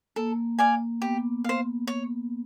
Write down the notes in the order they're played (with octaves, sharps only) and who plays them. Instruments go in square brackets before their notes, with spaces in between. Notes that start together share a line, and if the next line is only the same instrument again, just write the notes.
[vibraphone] A#3 [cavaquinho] A4
[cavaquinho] D5 F5 G#5
[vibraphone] B3 [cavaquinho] G4
[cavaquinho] C5 F5
C#5